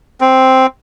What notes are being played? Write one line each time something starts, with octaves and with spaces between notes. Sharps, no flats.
C4